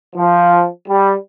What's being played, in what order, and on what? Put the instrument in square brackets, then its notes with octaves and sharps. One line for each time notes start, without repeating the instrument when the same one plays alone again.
[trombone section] F3
G3